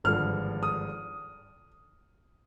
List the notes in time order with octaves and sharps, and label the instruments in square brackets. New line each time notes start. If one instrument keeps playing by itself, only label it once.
[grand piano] G#1 G2 D3 F3 F6
D#6